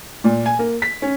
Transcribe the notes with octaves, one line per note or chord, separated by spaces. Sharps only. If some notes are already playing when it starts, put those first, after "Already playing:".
A#2
G#5
A#3
B6
C#4